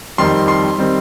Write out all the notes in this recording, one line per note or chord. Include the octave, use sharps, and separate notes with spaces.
F2 D#3 G3 C4 C6
C6
D#3 G3 C4